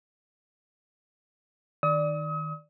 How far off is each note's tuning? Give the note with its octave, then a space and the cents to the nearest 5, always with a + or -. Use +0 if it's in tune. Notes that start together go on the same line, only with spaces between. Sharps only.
D#3 +0 D5 +0 D#6 +40